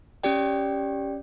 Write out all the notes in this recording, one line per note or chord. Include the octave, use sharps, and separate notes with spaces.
C#4 G4 D5 G5